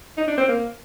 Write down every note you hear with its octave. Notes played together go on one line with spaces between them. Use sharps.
D#4
D4
C4
A#3